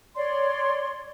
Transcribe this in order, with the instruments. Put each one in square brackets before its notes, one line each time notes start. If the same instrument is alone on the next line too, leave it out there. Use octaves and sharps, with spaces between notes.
[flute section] C#5 D5 C6